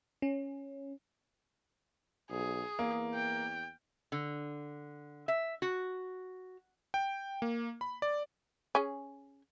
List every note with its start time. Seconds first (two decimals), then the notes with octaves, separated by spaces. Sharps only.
0.22 C#4
2.30 B1 G#4
2.79 E2 A#3
3.14 G5
4.12 D3
5.28 E5
5.62 F#4
6.94 G5
7.42 A#3
7.81 B5
8.02 D5
8.75 C#4 G#4